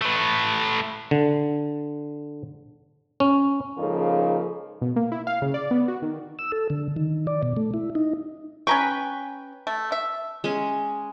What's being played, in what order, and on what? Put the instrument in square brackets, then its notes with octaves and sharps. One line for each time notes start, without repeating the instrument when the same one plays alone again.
[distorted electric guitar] A3 B4
[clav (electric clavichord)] D3
C#4
[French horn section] G#2 C#3 F3 A#3 D#4 A4
[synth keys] B2
A#3
E4
F5
C#3
D5
B3
F#4
D#3
[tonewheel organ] E6
A4
D3
D#3
D5
B2
A3
E4
D#4
[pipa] C#4 A#5 C#6 [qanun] B4 G5
[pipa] A3
E5
[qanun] G#3 C#4